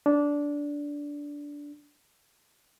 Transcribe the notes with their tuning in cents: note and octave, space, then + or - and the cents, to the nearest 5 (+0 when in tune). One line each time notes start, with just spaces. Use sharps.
D4 -15